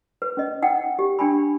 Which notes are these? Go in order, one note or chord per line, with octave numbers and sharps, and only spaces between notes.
B4
C#4 D#5
D#4 F#5 G5
G4
D4 G5 G#5 B5